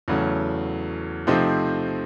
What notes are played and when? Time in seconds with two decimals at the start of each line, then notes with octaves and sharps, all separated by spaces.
0.08 E2 C#3 F#3 A3
1.27 C3 F3 A3 C4 D#4